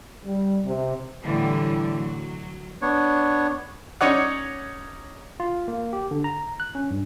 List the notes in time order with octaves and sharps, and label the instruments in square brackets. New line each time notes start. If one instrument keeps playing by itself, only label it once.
[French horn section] G3
C3
[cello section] A2 D3 E3 G3
F#3
[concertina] B3 D4 C#5
[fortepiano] C#4 D#4 C#5 D5 F#5
[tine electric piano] F4
A#3
G4
D3
A#5
F#6
C#4
G2